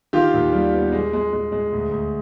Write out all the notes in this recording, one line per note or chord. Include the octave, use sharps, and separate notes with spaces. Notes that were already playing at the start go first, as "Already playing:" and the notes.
D#3 F4 G4
D#2
G3
B3
G#3
G#3
G#3
G#3
D2
D2